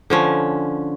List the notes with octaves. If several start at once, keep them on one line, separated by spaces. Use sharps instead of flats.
D3 F3 C#4